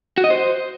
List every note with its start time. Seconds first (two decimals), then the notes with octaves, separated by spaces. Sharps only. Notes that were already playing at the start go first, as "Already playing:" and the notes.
0.18 F#4
0.24 D#5
0.30 C5